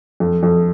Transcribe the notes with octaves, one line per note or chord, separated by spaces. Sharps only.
F2
F2